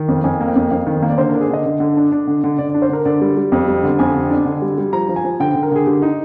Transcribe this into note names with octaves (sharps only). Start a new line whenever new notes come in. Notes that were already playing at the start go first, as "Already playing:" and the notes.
Already playing: D#3
F2
F2 G#5
A#3
G5
F2
F2 F5
D#3
A#3
D5
D3 C5
D4 A#4
G#4
D3 D#5
D3
D3
D4
D4
D3
D3
D3 D5
D4 D5
C5
D3 A#4
D3 D5
G3
G3
F2
G3
D3
F2 G#5
D3
D4
D3
G3
G3
F3 A#5
F3
G#5
F3
D3 G5
D3 G5
A#4
D3 G#4
D3 G4
D#4